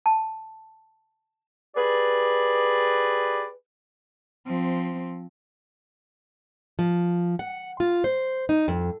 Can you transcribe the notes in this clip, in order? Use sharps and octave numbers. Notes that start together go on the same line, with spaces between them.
A5
G4 G#4 B4 D5
F3 C4
F3
F#5
F4
C5
D#4
F2